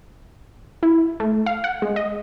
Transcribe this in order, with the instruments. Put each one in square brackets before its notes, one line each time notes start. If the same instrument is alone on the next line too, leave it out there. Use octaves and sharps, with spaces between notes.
[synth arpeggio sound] E4
A3
F5
F#5
G#3
D#5